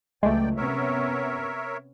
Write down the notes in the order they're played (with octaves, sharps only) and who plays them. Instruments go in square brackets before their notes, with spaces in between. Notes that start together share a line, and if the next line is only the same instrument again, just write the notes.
[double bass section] C#2 E3 F#3 [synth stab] G#3 A3 [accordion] D5 G5
[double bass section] C3 B3 C#4 [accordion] A#4 C#5 E5